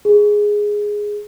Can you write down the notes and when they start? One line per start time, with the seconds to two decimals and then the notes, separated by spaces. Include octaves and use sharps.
0.05 G#4